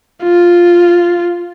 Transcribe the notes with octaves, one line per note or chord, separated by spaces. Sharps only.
F4